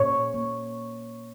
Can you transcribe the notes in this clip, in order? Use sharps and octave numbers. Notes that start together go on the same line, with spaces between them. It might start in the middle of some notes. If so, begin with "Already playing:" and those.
Already playing: A#2 C#5
A#3